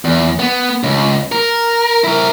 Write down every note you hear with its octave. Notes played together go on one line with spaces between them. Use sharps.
E2
B3
C#2
A#4
E4 A#4